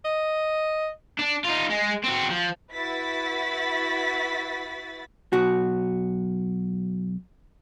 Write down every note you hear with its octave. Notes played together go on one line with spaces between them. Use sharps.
D#5
D4
D#4 F4
G#3
C4 F#4
F3
E4 F#4 B4 A6 B6
B1 F#4